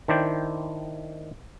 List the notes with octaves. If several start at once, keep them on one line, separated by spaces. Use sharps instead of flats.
D#3 D4 E4 C5 D5 G5